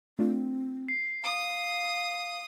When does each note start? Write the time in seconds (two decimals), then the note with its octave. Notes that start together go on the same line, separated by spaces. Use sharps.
0.19 A3 C4 D4 F4
0.88 C7
1.24 F5 D#6